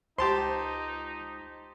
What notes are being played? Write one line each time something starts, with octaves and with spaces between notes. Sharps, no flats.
C#2 D#4 G4 C5 A5 C6